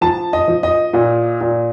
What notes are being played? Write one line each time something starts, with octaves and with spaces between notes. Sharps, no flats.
F3 A5
D#5
F3
D#5
A#2
A#2